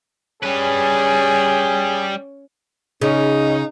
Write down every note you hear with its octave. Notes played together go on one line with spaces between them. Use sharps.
G3 C#4 G#4 B4
C#3 C#4 D#4